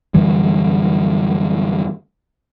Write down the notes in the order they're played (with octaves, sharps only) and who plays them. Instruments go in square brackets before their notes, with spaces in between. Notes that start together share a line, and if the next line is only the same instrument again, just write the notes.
[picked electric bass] F#2 D3 E3 G3